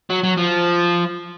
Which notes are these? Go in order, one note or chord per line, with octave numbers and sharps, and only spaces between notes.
F#3
F#3
F3